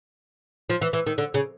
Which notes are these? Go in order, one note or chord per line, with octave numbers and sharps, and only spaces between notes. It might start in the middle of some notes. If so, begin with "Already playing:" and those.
F3
E3
E3
D#3
D3
C#3